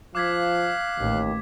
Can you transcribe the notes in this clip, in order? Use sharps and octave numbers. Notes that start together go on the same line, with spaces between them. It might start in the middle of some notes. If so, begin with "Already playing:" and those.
F3 F5 D6 F#6 G#6 B6
A1 D#2